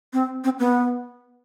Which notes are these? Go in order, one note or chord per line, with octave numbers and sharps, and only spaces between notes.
C4
C4
B3